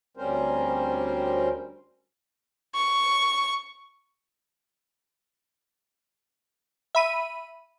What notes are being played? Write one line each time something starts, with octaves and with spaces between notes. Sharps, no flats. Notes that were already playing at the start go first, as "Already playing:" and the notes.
D2 G3 C4 C#4 A#4 C5
C#6
E5 B5 D#7